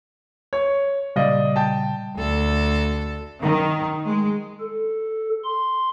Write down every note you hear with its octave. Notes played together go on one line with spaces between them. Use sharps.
C#5
A#2 C#3 G3 D5 D#5 F5
G5 A5
D2 A4
D#3
G#3
A4
C6